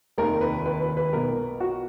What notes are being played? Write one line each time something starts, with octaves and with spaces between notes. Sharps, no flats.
F1 D#2 D#3 A#4
B4
B4
B4
B4
B1 B2 A#4
F#4